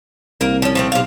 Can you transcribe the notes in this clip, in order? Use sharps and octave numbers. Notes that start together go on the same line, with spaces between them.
C2 A#3 A#4
F3 C#4
F3 A3 C4
B1 C3 F5